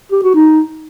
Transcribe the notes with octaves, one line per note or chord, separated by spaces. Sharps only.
G4
F#4
D#4